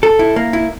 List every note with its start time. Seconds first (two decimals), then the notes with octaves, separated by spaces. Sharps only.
0.03 A4
0.19 E4
0.36 A#3
0.53 E4